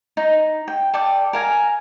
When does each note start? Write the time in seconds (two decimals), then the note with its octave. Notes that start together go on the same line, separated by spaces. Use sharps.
0.17 D#4
0.68 G5
0.94 A4 D5 G5
1.33 A#4 F5 G#5